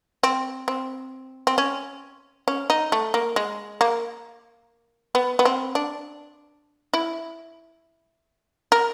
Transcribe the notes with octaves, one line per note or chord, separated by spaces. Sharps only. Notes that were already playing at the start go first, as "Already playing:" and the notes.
C4
C4
C4
C#4
C#4
D#4
A3
A#3
G#3
A#3
B3
B3
C4
D4
E4
A#4